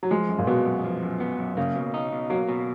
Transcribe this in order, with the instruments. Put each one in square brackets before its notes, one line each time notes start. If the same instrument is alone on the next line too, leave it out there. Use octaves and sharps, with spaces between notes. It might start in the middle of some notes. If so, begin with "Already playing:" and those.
[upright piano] F#3
[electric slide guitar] F3 [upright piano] G#3
[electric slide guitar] F#2
[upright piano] A#2
[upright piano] B2 [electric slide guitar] B3
[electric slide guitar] F#2
F3
F#2
B3
F#2
[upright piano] C#3 [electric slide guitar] A#3
[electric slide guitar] B2
D#4
B2
[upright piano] F#3 [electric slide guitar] A#3
[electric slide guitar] B2